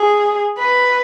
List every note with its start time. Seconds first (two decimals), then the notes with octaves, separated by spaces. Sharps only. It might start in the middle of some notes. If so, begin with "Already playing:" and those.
Already playing: G#4
0.59 B4